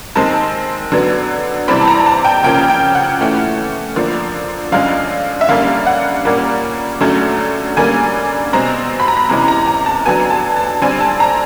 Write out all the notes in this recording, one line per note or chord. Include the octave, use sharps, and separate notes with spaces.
D#3 G#3 C4 A5
D3 F#3 B3
C3 E3 G3 C4 B5
A5
A#5
A5
G5
C#3 F3 A#3 C#4 G5
G5
F#5
E3 A3 C#4
D3 F3 A#3
D3 F3 G#3 C#4 F5
E5
D3 G3 A#3 C#4 F5
F#5
A#2 G3 A#3 C#4
D3 F#3 A3 C#4
D3 G3 A#3 C#4 G#5
B2 G#3 C4 A#5
B5
A#5
B5
C3 E3 G#3 C#4 A#5
A#5
A#5
A5
D3 F#3 B3 G#5
A5
A5
D3 G3 C4 G#5
A5
A#5